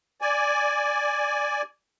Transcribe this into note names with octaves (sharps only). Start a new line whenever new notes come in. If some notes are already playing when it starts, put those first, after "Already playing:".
D5 G#5